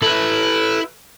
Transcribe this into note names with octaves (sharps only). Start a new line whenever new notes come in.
E4 A4 B4